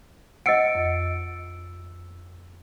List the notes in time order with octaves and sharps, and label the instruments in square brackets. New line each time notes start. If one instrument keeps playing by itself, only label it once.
[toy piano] D#5 F#5 [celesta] E6 C#7 D7
[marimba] F2